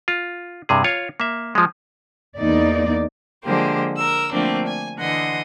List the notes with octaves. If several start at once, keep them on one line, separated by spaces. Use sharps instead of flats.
F4
G2 C3 G#4
F4 C#5 F5
A#3 E5
F3 G#3
E2 A#3 D#4 D5
D3 F3 G#3 A#3 G4 C5
A#4 E6
D3 F3 A3 A#3 C4 D4
G#5
D3 E3 D#5 F#5 C6 D#6